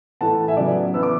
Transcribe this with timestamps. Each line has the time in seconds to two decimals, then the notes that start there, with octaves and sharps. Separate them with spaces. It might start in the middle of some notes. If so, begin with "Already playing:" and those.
0.21 A2 E3 A3 F#5 A5
0.48 E5 G#5
0.57 C#3 F#3 B3 D5 F#5
0.94 E3 B3 E6
1.03 D6